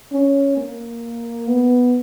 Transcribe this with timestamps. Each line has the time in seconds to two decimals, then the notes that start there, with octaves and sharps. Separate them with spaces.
0.12 C#4
0.57 A#3
1.47 B3